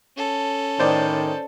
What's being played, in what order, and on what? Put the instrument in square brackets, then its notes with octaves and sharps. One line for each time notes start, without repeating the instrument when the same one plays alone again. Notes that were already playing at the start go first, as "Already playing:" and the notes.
[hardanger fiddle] C#4 A4
[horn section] A2 D#3 [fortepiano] C5 D5